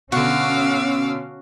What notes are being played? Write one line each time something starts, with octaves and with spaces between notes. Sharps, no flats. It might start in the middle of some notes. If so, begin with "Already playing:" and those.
B2 D3 C#4 F#4 F5 D6 E6